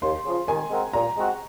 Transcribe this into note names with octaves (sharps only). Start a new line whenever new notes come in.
D#2 C6
C#3 F3
D#3 G#5
G#3 C4 F#4 A#4
A#2 A#5
G#3 C4 F#4